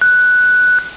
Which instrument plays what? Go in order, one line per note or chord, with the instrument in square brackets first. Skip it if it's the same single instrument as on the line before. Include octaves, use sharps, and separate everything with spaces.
[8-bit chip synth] F#6